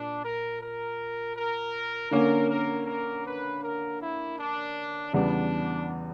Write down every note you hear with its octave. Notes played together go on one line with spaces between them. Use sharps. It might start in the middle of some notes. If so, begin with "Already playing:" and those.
Already playing: A#2 D4
A#4
A#4
A#4
D3 A#3 C#4 A#4
A#4
A#4
B4
A#4
E4
D4
E2 C#3 G3 B3 D4